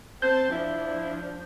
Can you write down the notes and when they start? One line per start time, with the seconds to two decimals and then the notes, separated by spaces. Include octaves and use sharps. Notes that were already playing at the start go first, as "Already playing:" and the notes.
0.22 C4 C5 A5 G6
0.52 F3 D4 E4